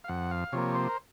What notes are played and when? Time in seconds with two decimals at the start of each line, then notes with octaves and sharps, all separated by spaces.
0.04 F5
0.08 F2 F#5
0.31 F5
0.52 C3 F3 A#3 C#5
0.75 C5
0.89 A#4